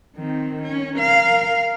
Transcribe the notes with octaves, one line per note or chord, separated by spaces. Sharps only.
D#3 C4
C#4
A#4 F5